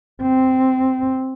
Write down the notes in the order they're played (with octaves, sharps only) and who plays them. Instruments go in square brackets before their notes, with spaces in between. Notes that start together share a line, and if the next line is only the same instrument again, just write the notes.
[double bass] C4